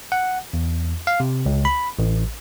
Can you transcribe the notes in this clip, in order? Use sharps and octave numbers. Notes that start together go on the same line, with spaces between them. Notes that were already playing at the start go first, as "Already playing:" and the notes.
F#5
E2
F5
C3
C#2
B5
A1